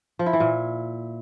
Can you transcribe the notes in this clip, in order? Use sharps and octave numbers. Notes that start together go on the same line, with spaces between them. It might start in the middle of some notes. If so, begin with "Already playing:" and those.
F3
E4
E3
A#2